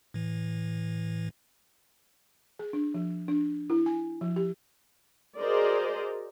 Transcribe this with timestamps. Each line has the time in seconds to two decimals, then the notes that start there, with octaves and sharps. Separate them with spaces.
0.14 A2 E3
2.59 G#4
2.73 D4
2.94 F3
3.28 D4
3.70 E4
3.86 G#5
4.21 F3
4.36 G4
5.39 F#4 G#4 A#4 C5 D5 D#5